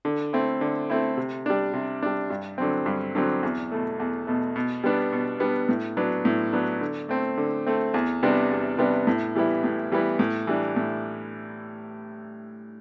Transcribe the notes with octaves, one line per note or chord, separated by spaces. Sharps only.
D3
A3 C4 E4
D3
A3 C4 E4
C3
G3 D4
C3
G3 D4
G2
D3 F#3 C4
G2
D3 F#3 C4
E2
B2 A3
E2
B2 A3
B2
G3 B3 D4
B2
G3 B3 D4
A2
F#3 B3 D4
A2
F#3 B3 D4
D3
A3 C4
D3
A3 C4
E2
C3 G3 B3 D4
E2
C3 G3 B3 D4
A2
E3 G3 B3 E4
A2
E3 G3 B3 E4
A2
E3 G3 D4
A2